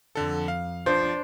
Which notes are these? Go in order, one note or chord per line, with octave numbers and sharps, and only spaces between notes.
F2 D3 A4
F5
F3 D4 C5